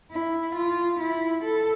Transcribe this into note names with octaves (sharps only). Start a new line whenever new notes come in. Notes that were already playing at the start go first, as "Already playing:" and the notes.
E4
F4
E4
A4